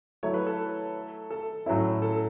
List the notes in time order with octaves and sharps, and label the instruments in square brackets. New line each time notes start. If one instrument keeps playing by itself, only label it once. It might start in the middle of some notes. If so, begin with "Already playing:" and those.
[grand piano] F#3 A3 E4 [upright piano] C#5
[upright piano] B4
A4
A4
[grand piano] A2 F#3 C#4 E4
[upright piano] A4